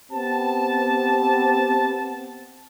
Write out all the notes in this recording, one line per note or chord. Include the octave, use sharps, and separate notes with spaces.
B3 C4 G4 A5